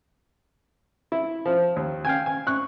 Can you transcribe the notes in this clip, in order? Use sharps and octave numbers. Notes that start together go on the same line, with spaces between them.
E4
F3
D#2
F5 G5 G#5
G#5
C#6 F#6